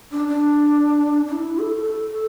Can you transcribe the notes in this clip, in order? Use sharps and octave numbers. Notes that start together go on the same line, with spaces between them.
D4
D4
D4
E4
A4
A4
A4